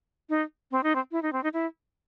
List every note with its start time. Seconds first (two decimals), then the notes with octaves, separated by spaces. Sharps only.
0.29 D#4
0.71 C4
0.83 D#4
0.95 C4
1.12 E4
1.22 D#4
1.33 C4
1.43 D#4
1.53 E4